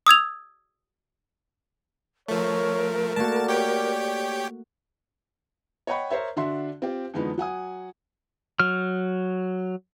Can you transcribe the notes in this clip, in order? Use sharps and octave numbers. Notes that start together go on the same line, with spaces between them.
D#6 E6 G#6 F7
F3 A3 A#4 C#5
A3 A#3 F#4 D5 A5
G4 C#5 G5
C#5 D#5 F#5 G5 B5 C#6
A#4 C5 C#5 E5
D3 D4 F#4 E5 C6
C4 F4 G4
F2 D3 E3 G#3 B3 D#4
F#3 F#5 G#5 D#6
F#3 F6